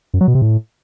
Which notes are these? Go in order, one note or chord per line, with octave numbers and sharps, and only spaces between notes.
F#2
F#3
B2
C3
A2